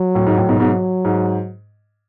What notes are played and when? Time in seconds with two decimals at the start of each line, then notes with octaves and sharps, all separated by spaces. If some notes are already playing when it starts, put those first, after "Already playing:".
Already playing: F#3
0.15 A2
0.27 G#2
0.37 A2
0.49 G#2 B2
0.60 G#2 B2 F#3
1.05 G#2